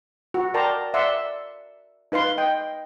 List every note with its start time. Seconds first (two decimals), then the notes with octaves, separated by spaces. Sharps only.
0.34 F#4
0.54 A#4 D5 G5 A5 A#5 C6
0.94 D5 E5 F#5 C6 E6
2.12 D#4 B4 F5 C6
2.38 D#5 G5